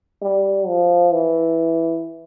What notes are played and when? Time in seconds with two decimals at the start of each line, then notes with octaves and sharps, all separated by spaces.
0.22 G3
0.67 F3
1.13 E3